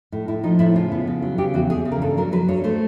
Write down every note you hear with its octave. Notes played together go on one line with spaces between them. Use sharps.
A2
A2 E4
F3 D#4
A2 E4
C#3 F4
B3
C#3
F#3
C#3 G4
E2 F#4
E2 G#4
C#3
A#4
G2 A4
F#3 A#4
F#3 B4
G2 C#5
A3 C5